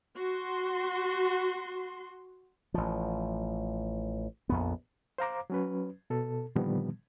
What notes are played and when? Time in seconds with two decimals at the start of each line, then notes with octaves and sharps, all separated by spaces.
0.15 F#4 C6
2.74 A1 F3
4.49 A#1 F2 B3
5.18 C5 F5 A#5 D6
5.50 F#3 C#4 B4
6.10 B2 A4
6.55 A#2 D3 D#3 F3 G3 B3